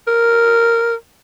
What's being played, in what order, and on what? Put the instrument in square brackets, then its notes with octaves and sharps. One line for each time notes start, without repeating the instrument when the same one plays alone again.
[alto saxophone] A#4